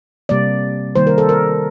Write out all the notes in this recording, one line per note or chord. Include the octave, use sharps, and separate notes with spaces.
C3 G3 A#3 D5
D#3 G3 A#3 C5
A#4
A4
A#4